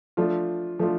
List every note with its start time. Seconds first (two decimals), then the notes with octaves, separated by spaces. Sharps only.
0.17 F3 A3 D4 F4
0.79 F3 A3 D4 F4